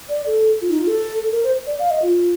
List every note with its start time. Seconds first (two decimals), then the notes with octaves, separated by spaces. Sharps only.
0.09 D5
0.26 A4
0.61 F4
0.70 D#4
0.79 F4
0.88 A4
1.32 A#4
1.44 C5
1.67 D5
1.79 F5
1.91 D#5
2.02 F4